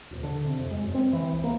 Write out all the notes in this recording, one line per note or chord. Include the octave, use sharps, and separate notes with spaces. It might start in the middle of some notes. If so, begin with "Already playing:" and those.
D#1
D3
C3
F2
G#3
F#2
C4
E3
C2
A#3